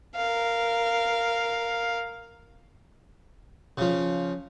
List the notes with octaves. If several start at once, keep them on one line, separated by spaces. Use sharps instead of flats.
A#4 F5
C#3 F3